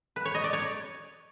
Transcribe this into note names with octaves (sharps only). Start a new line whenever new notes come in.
B4
C#5
D#5
D5
C#5